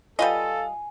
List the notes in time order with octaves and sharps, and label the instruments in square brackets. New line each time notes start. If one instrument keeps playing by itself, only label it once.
[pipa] G3 B4 D#5 [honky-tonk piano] F4 [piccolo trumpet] A4 [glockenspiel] G#5